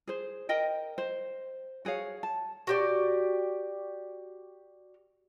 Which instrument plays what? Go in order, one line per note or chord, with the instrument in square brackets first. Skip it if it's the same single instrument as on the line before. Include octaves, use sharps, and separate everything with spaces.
[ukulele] G#4 C5
A#4 D#5 G5
C5
F#4 G#4 C#5 F5
A5
[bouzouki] F#4 G4 D5